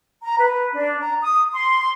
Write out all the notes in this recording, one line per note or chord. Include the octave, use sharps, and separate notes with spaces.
A#5
B4
D4
A#5
D#6
C6